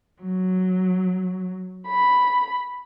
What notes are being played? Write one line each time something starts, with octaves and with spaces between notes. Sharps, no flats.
F#3
B5